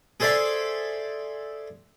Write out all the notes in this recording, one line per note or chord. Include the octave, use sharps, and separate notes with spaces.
G#4 A4 C5 D5 E5 A5